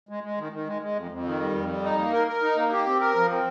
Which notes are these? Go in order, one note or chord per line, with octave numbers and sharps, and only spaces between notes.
G#3
G#3
D#3
D#3
G#3
G#3
F2
F2
D#3
G3
F2
G3
D#4
A#3
A#4
A#4
D#4
A#3
G4
C4
A#4
F3
C4